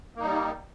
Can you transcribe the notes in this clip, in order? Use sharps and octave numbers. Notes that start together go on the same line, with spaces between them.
G3 A#3 D#4